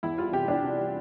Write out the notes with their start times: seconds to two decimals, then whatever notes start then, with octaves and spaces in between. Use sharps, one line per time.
0.03 E2 E4
0.18 G3 F4
0.32 C3 G4
0.48 E2 D4
0.63 C3
0.78 G3